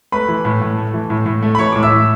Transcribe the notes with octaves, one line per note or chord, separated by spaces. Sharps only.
A3 B4 B5
E3
A2
A2
A3
E3
A2
A2
A3
B5
E3 C#5 C#6
A2 D6
E5 E6
A2